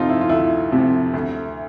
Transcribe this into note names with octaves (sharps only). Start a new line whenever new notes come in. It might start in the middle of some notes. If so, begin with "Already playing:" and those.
Already playing: D2 C3 F3 D#4 F4
E4
F4
D2 E4
C3 F3
D2